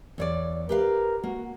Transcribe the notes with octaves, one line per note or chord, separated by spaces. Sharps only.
E2 C#5 D5
G4 A#4 B4 F5
A#3 F#4